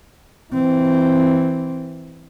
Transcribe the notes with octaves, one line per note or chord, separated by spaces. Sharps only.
E3 C4